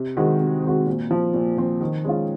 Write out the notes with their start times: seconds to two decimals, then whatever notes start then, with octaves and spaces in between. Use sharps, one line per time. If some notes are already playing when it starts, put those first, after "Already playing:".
Already playing: C3
0.17 D#3 G#3 C4 F#4
0.40 C3
0.64 D#3 G#3 C4 F#4
0.86 A#2
1.11 F3 C4
1.34 A#2
1.58 F3 C4
1.81 D#3
2.04 G#3 C#4 F4